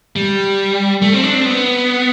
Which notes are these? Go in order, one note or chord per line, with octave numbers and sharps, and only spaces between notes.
G3
A3
C4
D4
C4
B3